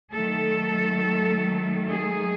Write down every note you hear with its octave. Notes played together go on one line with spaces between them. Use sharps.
D#3 F#3 A3 A4
G#4